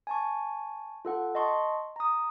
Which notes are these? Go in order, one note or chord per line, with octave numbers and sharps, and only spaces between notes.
G#5 A5 C#6
F4 A4 F#5
D#5 A5 C6 C#6
A#5 D#6